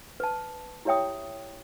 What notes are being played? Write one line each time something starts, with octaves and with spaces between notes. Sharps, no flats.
B4 A5
E4 G4 C#5 E5 G5 D#6